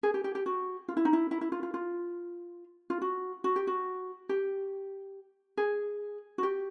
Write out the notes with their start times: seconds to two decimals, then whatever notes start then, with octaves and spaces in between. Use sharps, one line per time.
0.03 G#4
0.14 G4
0.24 G4
0.35 G4
0.46 F#4
0.88 F4
0.97 E4
1.05 D#4
1.13 E4
1.31 E4
1.41 E4
1.52 F4
1.63 F4
1.74 F4
2.90 F4
3.02 F#4
3.44 F#4
3.56 G4
3.67 F#4
4.29 G4
5.57 G#4
6.38 F#4
6.43 G4